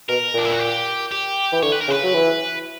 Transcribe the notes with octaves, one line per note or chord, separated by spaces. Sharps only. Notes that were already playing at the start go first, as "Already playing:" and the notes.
B2 A#4
A#2 D4
E4
F#4
G4
G4
E3
D3 C#5
B4
A#4
C#3 B4
F#3
E3